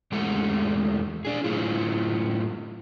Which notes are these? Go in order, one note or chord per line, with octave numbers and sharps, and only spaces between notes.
E2 G#3 A3 G4 F#5
D4 G#4
A2 F#3 E4 F4